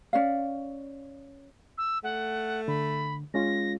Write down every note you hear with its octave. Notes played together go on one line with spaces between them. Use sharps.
C#4 D5 F5
E6
A3 F#5
D3 B5
G#3 C#4 F4 A#6